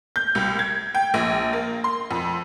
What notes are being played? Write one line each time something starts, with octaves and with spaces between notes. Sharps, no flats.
G6
C2
G#6
G5
A#1
A#3
C6
F2